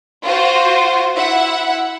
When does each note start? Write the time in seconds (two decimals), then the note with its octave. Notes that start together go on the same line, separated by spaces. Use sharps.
0.23 F4 F#4 C5
1.16 E4 E5 F#5